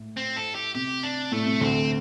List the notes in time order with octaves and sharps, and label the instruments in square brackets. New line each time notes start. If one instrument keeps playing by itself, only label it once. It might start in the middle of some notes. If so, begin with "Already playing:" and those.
Already playing: [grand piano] A2
[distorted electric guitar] C4
A4
G4
[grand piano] C3 [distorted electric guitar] G4
[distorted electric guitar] D4
[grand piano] A2 [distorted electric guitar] A3
[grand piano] C3
[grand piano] D2 D3 [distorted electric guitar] C4